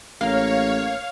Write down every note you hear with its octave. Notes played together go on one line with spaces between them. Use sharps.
A1 A#3 C#5 F5